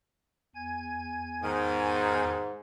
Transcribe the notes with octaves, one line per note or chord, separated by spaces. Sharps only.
E2 G#5 G#6
G#2 D#3